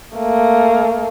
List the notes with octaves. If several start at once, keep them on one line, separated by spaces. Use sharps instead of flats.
A3 A#3